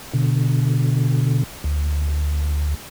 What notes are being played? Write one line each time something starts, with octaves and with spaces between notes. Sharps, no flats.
B2 D3
D2